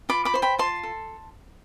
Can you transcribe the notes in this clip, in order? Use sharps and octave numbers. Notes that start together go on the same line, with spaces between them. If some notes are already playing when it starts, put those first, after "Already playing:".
F4 B5 D6
B5 D6
C5 C6
G5 B5
F4 A5 C6
A4